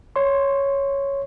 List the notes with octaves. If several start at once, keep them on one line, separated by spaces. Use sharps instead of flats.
C#5 C6